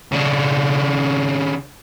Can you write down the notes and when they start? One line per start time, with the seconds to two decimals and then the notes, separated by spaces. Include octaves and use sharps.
0.12 C#3 D4